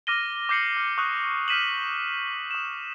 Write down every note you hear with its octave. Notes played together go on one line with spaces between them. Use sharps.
D6 F6 A#6 D#7 G7
D6 G6 C7 C#7 F#7
F6
C#6 D#6 F#6
F6 G6 B6 D#7 E7 F#7
D#6 E7